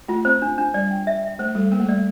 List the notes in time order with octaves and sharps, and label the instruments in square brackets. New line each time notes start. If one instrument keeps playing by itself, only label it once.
[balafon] A3 [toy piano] F4
[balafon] C4 [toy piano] C5
[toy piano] D4
D4
[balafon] G3 [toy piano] D5
[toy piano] G5
E5
E5
[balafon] A3 [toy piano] C5
[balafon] G3 [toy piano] A4
[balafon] A#3 [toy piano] A#4
[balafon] A3
[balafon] G3 [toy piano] D5